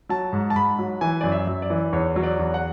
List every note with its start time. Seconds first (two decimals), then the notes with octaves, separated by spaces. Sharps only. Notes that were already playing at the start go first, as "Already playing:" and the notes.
0.09 F#3 A5
0.33 G#2
0.50 A5
0.55 G#2 B5
0.79 F#3
1.01 E3 G#5
1.21 F#2 D5
1.32 E5
1.47 F#2
1.62 D5
1.70 E3
1.93 E2 C#5
2.16 F#3
2.23 D5
2.39 E2
2.54 F#5